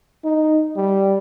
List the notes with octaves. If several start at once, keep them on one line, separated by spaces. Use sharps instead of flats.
D#4
G3